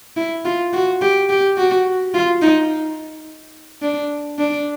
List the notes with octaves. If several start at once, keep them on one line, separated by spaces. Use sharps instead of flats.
E4
F4
F#4
G4
G4
F#4
F4
D#4
D4
D4